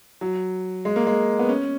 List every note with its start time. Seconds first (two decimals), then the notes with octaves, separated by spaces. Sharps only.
0.21 F#3
0.85 G#3
0.96 A#3
1.07 G#3
1.39 B3
1.49 C#4